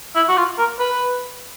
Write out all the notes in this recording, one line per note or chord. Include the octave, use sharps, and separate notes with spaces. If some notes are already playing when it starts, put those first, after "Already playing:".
E4
F#4
F4
A#4
B4